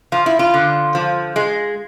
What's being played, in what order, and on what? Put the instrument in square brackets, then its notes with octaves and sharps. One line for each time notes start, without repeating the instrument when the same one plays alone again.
[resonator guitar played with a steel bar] F3 F4
E4
F4
D3
F3
G#3